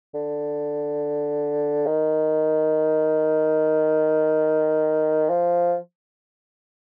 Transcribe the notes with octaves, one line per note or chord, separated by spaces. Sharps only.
D3
D#3
F3